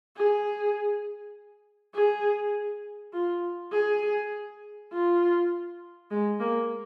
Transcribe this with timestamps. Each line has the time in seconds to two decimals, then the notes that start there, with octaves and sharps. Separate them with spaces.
0.17 G#4
1.95 G#4
3.13 F4
3.72 G#4
4.92 F4
6.11 G#3
6.40 A#3